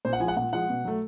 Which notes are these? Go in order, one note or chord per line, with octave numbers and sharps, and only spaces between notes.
A#2 C5
F#5
F3 G#3 F#5 G#5
A#2 F#5
F3 G#3 F#5
B2
F#3 A3